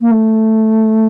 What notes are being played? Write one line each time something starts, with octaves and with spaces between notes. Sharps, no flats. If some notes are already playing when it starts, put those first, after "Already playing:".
A#3
A3